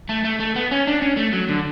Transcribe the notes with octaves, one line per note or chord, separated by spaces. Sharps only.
A3
A3
A3
B3
C#4
D4
C#4
A3
F#3
D3